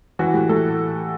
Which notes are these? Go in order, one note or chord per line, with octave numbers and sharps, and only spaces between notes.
E3 F#4
A2 G4
A2 A4